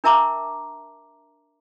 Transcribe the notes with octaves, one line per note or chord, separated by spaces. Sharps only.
D4 A#4 E5 A5 A#5 D6